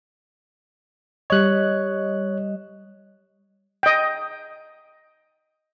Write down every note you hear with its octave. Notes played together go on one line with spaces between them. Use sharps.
G3 C#5 D#5 F#6
D#5 G5